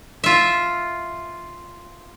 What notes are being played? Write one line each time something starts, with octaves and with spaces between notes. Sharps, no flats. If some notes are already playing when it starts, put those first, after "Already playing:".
F4 E5